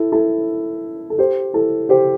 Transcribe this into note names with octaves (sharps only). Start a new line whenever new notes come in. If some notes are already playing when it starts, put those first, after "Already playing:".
Already playing: E4 A4
E4 A4
A4
G4 C5
E4 A4
G4 C5